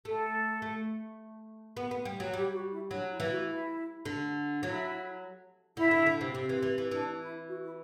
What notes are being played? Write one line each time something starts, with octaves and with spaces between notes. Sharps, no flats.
A3 A4
A3
B3
B3
G3
F#3
G3 G4
F#4
E4
F#3 D4
E4
E3
F#4
E4
D3
F#3 E4
D3 E4
D3
D3
C3
C3
E3
E3
E3
E3 D4
E4
F#4
E4